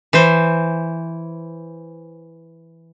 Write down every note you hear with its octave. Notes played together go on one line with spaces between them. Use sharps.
E3 C5